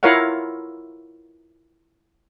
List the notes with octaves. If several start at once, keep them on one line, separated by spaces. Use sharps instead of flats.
E4 F4 A#4 C#5 F5 F#5